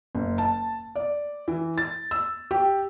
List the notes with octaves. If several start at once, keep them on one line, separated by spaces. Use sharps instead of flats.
F#1
A5
D5
E3
A6
E6
G4